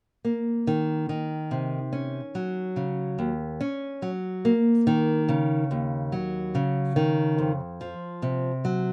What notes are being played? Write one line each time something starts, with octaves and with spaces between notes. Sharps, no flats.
A#3
D#3
D#3
C3
C#4
F#3
C#3
D#2
C#4
F#3
A#3
D#3
C#3
D#2
F#3
C#3
D#3
F2
F3
C3
F#3